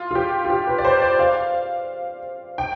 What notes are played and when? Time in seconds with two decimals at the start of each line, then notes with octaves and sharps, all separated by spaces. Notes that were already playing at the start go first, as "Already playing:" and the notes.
Already playing: F4
0.11 F4
0.15 G4
0.45 F4
0.50 G4
0.67 B4
0.78 D5
0.85 C5
1.02 D5
1.19 F5
2.58 G5